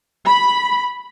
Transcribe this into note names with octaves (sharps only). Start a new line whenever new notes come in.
B5